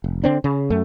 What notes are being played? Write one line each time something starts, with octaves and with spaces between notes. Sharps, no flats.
F1
D3 C4 D4
C#3
F#2 A3